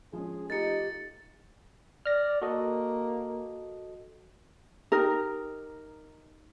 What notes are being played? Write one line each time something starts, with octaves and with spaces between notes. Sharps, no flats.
F3 G#3 C#4 G#4
A3 D#4 F4 G4 A6 C#7
D5 F6 A#6
A#3 F#4 A4 D#5
D#4 G4 A#4